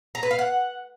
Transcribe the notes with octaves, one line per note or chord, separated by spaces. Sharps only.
A#5
B4
F5
F#5